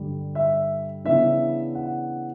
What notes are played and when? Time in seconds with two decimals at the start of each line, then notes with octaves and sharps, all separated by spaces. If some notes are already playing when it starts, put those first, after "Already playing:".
Already playing: G2 D3 G3
0.35 E5
1.04 C#3 E3 B3 D4 E5
1.75 F#5